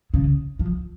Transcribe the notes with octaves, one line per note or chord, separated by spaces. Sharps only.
C#3
F3